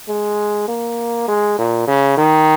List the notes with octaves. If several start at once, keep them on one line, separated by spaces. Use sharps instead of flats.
G#3
A#3
G#3
A#2
C#3
D#3